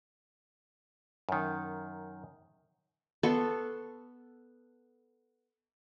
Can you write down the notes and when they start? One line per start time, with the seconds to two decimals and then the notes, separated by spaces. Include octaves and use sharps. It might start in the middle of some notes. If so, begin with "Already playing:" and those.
1.29 F#2 D#3
3.23 B3 A4 C6 C#6